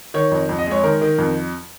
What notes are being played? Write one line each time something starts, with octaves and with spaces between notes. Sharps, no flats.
D#3 C#5
F2
F2
D#5
G#3 C#5
D#3 A#4
D#3
F2